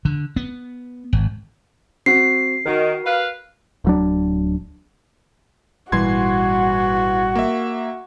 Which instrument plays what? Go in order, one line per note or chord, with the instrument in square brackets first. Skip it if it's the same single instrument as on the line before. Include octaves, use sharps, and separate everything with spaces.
[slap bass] D3
B3
G#1
[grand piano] C4 F#4 [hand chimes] C7
[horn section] D#3 [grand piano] F#4 A#4
[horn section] B4 F5
[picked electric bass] D1 F#3 D4
[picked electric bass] G#1 A#2 G3 [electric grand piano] E3 C6 G#6 [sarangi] F#4
[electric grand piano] A#3 E5